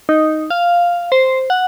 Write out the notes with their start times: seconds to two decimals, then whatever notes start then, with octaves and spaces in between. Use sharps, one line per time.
0.09 D#4
0.50 F5
1.12 C5
1.50 F#5